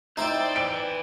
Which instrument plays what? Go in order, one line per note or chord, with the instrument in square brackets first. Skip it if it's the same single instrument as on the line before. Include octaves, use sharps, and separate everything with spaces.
[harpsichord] D#4 E4 [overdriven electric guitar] C5 [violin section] D5 G5
[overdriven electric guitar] B4 E5 [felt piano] D7